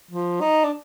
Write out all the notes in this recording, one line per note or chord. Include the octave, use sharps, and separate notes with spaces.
F3
D#4
D4